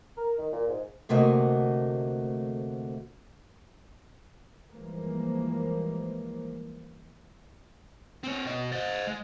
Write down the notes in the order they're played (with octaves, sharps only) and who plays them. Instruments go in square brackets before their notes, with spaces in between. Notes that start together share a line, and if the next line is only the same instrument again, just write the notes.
[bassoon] A#4
D#3
A#2
G#2
[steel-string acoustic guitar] D2 C3 A3 A#3 F#4 D#5
[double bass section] E3 F3 G3 G#3 A#3
[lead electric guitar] C4 C#5
B2 D#5
C5 D#5
G#3